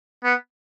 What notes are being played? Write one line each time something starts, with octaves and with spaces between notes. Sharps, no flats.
B3